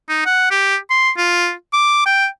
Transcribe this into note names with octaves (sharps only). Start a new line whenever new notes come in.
D#4
F#5
G4
C6
F4
D6
G5